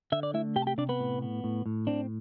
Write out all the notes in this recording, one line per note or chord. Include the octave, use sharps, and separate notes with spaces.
D3 E5
D5
A3 E4 E5
C3 G4 G5
A5
G4 G5
C3 D4 D5
B3 B4
A2
B3
A2
A2
C4 D4